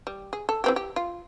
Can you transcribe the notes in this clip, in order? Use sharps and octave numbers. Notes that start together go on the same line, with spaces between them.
G3
G#4
A4
E3 C4 G4
G4
F4